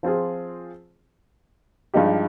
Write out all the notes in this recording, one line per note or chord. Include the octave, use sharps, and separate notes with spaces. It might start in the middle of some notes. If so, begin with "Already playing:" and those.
F3 C4 F4 G#4
G2 F3 G#3 D#4 G4